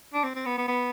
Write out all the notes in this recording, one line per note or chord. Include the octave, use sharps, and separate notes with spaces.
D4
C4
C4
B3
B3
B3